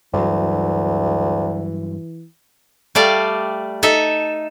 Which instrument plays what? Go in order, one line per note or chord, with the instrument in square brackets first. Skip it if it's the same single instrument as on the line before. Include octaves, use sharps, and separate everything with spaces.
[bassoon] D2 [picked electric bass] G2 F#3 [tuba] E3
[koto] G3 A3 D5 F5
D#4 A4 E5